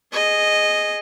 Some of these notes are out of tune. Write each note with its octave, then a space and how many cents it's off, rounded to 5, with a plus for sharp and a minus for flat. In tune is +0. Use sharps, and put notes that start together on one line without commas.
G#4 +0 D#5 -10